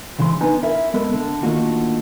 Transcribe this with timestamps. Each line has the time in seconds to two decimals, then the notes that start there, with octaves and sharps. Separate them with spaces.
0.19 D2 C#3 E3 G#3 C6
0.41 B3 D4 D#4 G#5
0.63 E4 A#4 E5
0.94 G#3 B3 A4 A#4
1.14 D3
1.43 D3 D#3 A3 A#3 F4 F#4